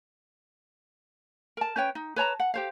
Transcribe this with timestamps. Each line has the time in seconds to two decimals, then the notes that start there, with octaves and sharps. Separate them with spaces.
1.57 A#4 A5
1.76 C#4 B4 C#5 G5
1.95 D#4
2.16 B4 C#5 A5 A#5
2.40 F#5
2.54 G4 C5 F5